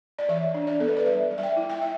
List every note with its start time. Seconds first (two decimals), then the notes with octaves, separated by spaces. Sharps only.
0.19 D5
0.29 E3 E5
0.54 D4
0.67 D5
0.79 B3 A4
0.88 B4
0.97 D5
1.06 G3 E5
1.31 G3
1.38 E5
1.43 G5
1.57 E4
1.70 G5
1.82 E5